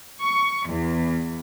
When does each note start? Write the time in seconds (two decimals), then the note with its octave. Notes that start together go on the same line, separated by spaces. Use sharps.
0.20 C#6
0.68 E2